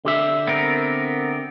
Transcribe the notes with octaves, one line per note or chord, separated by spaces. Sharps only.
D3 G4 E5
B3 C4 A#4